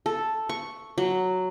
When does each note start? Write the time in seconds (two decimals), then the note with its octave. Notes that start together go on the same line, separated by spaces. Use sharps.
0.06 A4
0.49 C#6
0.98 F#3